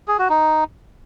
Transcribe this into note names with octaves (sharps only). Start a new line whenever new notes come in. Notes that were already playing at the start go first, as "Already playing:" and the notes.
G#4
F#4
D#4